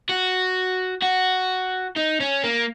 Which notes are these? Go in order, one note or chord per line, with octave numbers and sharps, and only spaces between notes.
F#4
F#4
D#4
C#4
A#3